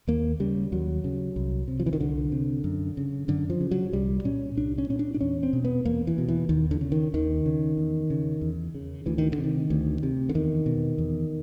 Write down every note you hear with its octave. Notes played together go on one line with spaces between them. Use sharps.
D#2 A#3
C#3 G3
D#2 F#3
C#3
C2
C3
F3
E3
D#3
C2 D3
C3
F#2
C#3
F#2 D3
F3
C#3
F#3
C2 G3
A#2 C#4
C2 D4
C#4
A#2 C#4
D4
D4
E2 C#4
C4
B2
B3
E2 A#3
E3
B2
E3
D#2 D#3
D3
C#3
D#3
D#2 D#3
C#3
E2
C#3
E2
C#3
D2 E3
D#3
D3
C3
D#3
D2
C3
D3
E2 D#3
B2
E2